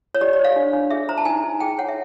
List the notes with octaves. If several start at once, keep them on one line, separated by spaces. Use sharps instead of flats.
C#5
G4 D5
D5
C5
F5
D4
D4
G#4 E5
C5 A#5
A5
D#4 G#5
D#4
G#4 G5
C#5 F#5
E5